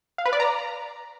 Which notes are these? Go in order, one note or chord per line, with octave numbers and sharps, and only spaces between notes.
F5
B4
D5
A#5